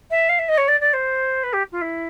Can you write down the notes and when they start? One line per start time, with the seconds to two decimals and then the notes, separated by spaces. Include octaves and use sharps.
0.10 E5
0.29 F5
0.38 E5
0.48 D#5
0.57 C#5
0.68 D5
0.80 D5
0.93 C5
1.43 B4
1.53 G4
1.72 F4
1.81 E4